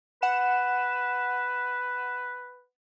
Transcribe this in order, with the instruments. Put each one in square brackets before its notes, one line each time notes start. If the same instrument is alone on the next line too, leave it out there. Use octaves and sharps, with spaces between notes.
[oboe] B4 [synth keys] F#5 E7